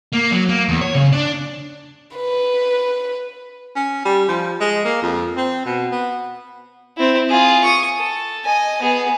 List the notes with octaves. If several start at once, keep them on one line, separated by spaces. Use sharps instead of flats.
A#3
F#3
A#3
E2
C#5
C#3
D4
B4
C#4
G3
F3
G#3
A#3
F2
C4
B2
B3
C4 E4
F4 G#4
C#6 D#6
A4
D#5 G#5
B3 G#4